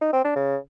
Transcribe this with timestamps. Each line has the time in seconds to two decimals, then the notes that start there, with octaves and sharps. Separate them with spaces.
0.01 D#4
0.13 C4
0.24 D4
0.36 C#3